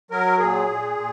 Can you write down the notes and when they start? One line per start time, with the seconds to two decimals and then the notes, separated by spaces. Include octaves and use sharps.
0.11 F#3 A#4
0.39 A#2 G#4
0.68 A#2
0.96 A#2